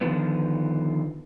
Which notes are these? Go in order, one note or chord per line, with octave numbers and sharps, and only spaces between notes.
D3 D#3 F3 B3